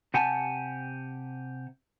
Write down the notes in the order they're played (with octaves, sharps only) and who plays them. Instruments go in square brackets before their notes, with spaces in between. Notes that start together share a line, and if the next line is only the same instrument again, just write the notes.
[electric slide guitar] C3 G4 F#5 G#5 A5